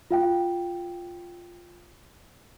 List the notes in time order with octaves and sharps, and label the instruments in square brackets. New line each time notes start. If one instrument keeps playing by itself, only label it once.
[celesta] F4 F5 G5